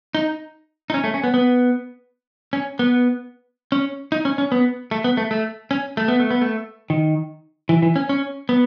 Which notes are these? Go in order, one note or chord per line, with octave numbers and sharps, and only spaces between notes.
D#4
D#4
C#4
A3
C#4
B3
B3
C#4
B3
C#4
D#4
C#4
C#4
B3
A3
B3
A3
A3
C#4
A3
B3
A3
B3
A3
D#3
E3
E3
C#4
C#4
B3